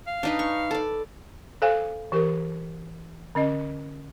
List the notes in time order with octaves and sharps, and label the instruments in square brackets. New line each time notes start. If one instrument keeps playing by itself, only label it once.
[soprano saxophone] F5
[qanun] D4 D#4 B4
C#6
A4 D5
[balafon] A4 C5 F5 G#5
E3 G4 A#4
D3 C#4 D#5